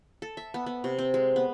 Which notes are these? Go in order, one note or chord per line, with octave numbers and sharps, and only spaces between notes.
A4
E5
B3
B3
C3
C4
G#3
B3